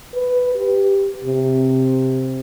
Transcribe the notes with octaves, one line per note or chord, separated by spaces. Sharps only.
B4
G4
C3